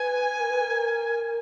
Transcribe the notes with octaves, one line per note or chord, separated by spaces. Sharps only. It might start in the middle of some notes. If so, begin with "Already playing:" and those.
Already playing: B4 G#5
A#4
B4
A#4